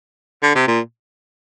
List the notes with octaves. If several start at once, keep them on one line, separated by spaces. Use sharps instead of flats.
D3
C3
A#2